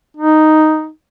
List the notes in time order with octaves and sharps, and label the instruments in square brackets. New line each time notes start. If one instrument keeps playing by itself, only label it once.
[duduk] D#4